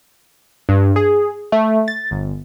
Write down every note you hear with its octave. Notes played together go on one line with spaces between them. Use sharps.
G2
G#4
A3
A6
G1